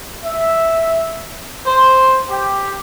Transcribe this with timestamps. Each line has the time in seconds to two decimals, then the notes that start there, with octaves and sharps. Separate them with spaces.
0.25 E5
1.67 C5
2.30 G4